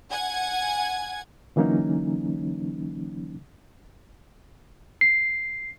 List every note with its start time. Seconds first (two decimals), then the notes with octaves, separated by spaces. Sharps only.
0.11 F#5 G#5 G#6
1.56 D3 E3 F#3 A#3 C#4 D#4
5.01 C7